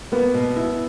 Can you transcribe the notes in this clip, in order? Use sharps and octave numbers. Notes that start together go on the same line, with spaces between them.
A#3 B3
B2
E4